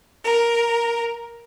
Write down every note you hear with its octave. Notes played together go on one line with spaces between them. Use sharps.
A#4